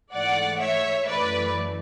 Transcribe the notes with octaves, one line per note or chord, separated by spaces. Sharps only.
G#2 E3 A3 D5 F#5
C#5 E5
F#2 E3 A3 B4 D5